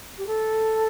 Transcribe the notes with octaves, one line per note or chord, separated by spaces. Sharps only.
G4
A4